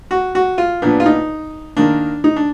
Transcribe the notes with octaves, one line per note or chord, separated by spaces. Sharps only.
F#4
F#4
F4
A#2 F3 B3 D4
F4
D#4
D#3 A#3 D4
D#4
D4